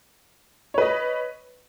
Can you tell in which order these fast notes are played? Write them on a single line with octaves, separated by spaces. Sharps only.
C#5 B4 D#5